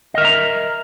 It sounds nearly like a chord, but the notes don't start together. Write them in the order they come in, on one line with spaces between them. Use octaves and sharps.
D#5 A#4 E5 A#5